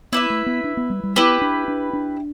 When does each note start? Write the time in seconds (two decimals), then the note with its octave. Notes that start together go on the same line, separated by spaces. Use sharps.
0.12 B3 E4 B4 E5
0.30 A3
0.46 B3
0.64 D4
0.77 B3
0.90 G3
1.03 G3
1.16 B3 E4 G4 B4
1.42 D4
1.68 D4
1.93 D4